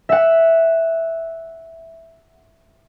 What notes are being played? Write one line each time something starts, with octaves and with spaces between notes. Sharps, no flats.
E5 F#5